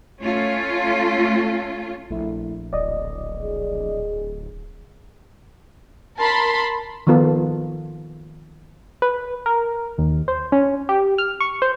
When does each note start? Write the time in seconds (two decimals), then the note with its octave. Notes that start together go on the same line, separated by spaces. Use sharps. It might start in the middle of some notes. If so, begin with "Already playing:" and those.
0.23 A3 C#4 F4
2.10 A#1 A3 E4
2.73 D1 D5 D#5
3.42 G#4
6.18 A#4 A5 B5 C6
7.07 D#3 F3 B3 F4 A4
9.02 B4
9.46 A#4
9.98 D#2
10.28 C5
10.52 C#4
10.89 G4
11.18 F6
11.40 C#6
11.62 C5